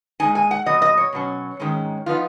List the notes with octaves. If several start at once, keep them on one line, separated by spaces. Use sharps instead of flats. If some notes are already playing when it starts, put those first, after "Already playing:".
A#2 G#3 D#4 G#5
G#5
F#5
A#2 F#3 B3 D#5
D#5
C#5
B2 F#3 C#4
G#2 D#3 G#3 C#4
F3 B3 D#4 F4